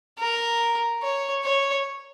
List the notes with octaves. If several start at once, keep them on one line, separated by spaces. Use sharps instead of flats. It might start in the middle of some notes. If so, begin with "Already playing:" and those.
A#4
C#5
C#5